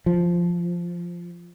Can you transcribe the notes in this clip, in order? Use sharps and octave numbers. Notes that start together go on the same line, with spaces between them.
F3